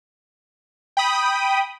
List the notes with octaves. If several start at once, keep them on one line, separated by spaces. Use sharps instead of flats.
G5 B5 D#6